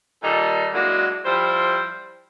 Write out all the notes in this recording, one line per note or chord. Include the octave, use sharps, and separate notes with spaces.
A#2 D#3 G3 D#4 A4
F#3 G#3 A#3 D4 E4 F#4
F3 G3 E4 C5